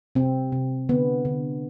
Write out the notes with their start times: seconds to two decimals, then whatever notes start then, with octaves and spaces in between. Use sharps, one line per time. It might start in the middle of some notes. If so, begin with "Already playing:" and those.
0.15 C3 C4
0.52 C3
0.89 D3 B3
1.25 D3